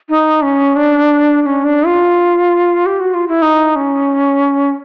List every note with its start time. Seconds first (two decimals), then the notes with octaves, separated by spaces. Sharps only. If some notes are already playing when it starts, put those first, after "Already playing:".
0.09 D#4
0.42 C#4
0.76 D4
1.42 D4
1.46 C#4
1.64 D4
1.86 F4
2.86 G4
3.00 F#4
3.14 F4
3.28 E4
3.42 D#4
3.76 C#4